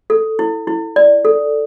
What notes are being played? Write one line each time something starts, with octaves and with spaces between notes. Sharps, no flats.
A4
E4
E4
D5
A4